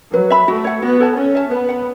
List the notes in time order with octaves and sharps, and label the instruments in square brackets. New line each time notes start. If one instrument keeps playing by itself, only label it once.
[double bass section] F#3 [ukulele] B4
[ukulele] E5 B5
[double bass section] A3 [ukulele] F#4
[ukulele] C#5 F#5
[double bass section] B3 [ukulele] F#4
[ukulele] A4 C#5 A5
[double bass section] C#4 [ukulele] A4
[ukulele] E5 A5
[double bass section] B3 [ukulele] B4
[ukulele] F#5 B5